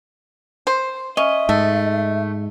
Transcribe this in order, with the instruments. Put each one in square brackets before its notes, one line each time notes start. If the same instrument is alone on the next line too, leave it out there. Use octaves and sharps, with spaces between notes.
[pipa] C5
[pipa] C#4 [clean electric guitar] D#5 [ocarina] E5
[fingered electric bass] G#2 [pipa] A3